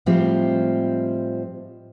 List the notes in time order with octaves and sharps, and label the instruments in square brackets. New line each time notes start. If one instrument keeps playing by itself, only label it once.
[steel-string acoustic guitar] A2 F3 G3 G#3 C4 F4